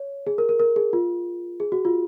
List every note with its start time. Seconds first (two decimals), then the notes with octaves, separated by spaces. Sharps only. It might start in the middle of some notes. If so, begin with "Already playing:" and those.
Already playing: C#5
0.27 G#4
0.38 A#4
0.49 A#4
0.60 A#4
0.76 G#4
0.93 F4
1.60 G#4
1.72 F#4
1.85 F4